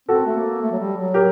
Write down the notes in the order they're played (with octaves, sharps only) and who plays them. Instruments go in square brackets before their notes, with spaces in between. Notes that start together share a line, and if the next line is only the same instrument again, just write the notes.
[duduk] C4 [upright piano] F#4 A4
[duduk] A3
A#3
A3
F#3
G3
F#3
[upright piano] G4 A#4